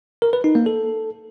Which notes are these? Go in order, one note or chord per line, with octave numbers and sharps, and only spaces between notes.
A#4
B4
D#4
A#3
A4